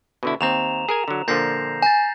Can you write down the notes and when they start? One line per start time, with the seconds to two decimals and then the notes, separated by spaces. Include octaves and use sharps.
0.23 B2 D3 E4
0.41 D#2 C4 A#5 E7 F7
0.89 G#4 A#4 G#5
1.08 D3 F#3
1.28 A#2 D3 F3 G6 A#6 C7
1.82 G#5 G6 A6